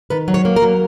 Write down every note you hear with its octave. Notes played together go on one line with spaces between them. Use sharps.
D#3 B4
F#3
C#5
A#3
A#4
F#3